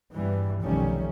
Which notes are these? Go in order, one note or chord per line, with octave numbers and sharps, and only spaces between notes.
E2 G2 E3 G3
F1 B1 D#3 G3 A3 C#4